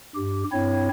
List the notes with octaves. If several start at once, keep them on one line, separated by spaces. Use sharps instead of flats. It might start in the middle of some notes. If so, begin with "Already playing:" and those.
G2 G4
G2 C4 E4 C#5